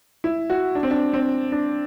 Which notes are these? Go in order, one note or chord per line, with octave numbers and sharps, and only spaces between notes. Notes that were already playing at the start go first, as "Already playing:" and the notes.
E4
F#4
D4
C4
D4
C4
D4